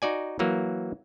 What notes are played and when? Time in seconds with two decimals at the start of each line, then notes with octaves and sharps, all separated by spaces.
0.02 D#4 F#4 D5 G#5
0.39 E3 F#3 A#3